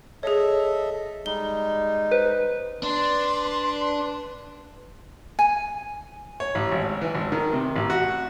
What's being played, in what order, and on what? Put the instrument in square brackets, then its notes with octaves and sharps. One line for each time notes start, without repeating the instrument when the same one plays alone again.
[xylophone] G#4 C#5 [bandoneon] A4 D#5 E5
[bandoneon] G3 G#3 D#4 [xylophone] G7
[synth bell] B4 [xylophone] C5
[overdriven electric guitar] D4 [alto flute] B4 [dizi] C6
[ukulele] G#5
[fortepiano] C#5
A1
G#1
E3
G#1
D#3
C3
A1
F#4